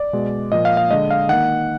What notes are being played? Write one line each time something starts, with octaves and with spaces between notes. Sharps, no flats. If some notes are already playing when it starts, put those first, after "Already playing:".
Already playing: D5
B2 G#3
A#2 F3 A#3 D#5
F5
F5
D3 G#3 D#5
F5
D#3 A#3 F#5